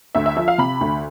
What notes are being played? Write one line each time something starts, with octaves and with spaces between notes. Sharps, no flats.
D2 E5
E5
F3 E5
F5
C3 B5
D2